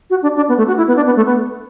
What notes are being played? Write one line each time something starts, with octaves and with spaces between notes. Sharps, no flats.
F#4
D4
D4
B3
A3
F#4
E4
B3
D4
B3
A3
B3